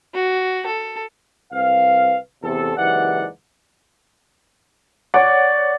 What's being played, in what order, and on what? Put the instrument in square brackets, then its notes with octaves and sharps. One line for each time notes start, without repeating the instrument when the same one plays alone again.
[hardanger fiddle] F#4
A4
[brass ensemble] C2 C4 B4 F5
E2 C3 A4
F#1 G#2 E3 G4 D5 F#5
[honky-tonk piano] C#5 F#5 [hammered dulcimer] D5